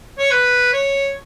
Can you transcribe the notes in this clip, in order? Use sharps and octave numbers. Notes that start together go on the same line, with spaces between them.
C#5
B4
C#5